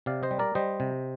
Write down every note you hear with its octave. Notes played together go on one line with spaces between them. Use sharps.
C3 D5 F5
C5 D#5
G3
A#4 D5
G3 C5 D#5
C3